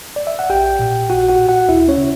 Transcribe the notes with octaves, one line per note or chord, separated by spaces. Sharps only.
D5
E5
F#5
A#1 G4 G5
A#2
A#1 F#4 F#5
F#4 F#5
A#2
F#4 F#5
D2 E4 E5
C#4 C#5
C#3